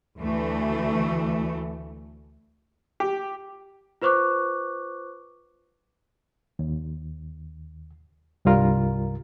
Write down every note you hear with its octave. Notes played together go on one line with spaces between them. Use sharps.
D2 E3 A3
G4
F4 B4 C5 C#6 D6 F#6
D#2
C2 G2 G3 F4 A#4